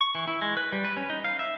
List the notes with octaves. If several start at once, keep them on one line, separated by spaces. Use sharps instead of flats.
C#6
E3
E4
G#3
B4
G3
B4
C#4
D#4
F5
E5